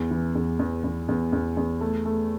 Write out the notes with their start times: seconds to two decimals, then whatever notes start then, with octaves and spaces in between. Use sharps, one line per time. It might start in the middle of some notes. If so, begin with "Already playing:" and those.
Already playing: E2
0.11 E3
0.35 E2
0.59 E2
0.84 E2
1.09 E2
1.33 E2
1.57 E2
1.81 A3
2.05 A3